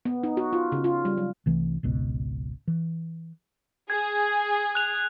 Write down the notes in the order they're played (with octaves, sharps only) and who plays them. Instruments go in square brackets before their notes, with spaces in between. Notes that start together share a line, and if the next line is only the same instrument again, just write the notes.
[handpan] B3
D#4
F#4
F4
C#3
F4
G3
F#3
[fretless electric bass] C2 E3 A3
G#1 C#2 B2
E3
[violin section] G#4 [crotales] G#6
[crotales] F#6 F7